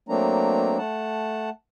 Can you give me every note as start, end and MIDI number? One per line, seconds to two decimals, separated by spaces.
0.09 0.78 54
0.09 0.78 57
0.09 0.78 58
0.09 0.78 60
0.09 0.78 62
0.09 0.78 82
0.78 1.50 57
0.78 1.50 78
0.78 1.50 81